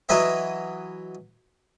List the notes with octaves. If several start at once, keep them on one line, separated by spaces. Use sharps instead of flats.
E3 F#3 B4 D#5 E5